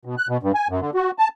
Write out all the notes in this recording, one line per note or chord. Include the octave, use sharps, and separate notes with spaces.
B2
F#6
B2
G2
G#5
F#2
D3
F#4
A5